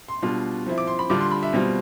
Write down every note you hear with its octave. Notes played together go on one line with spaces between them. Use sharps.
C6
B2 G3 D4 F4
F3 C4 E4
D6
C6
B5
D3 G3 D4 F4 D6
C6
B5
E5
B2 G3 C4 F4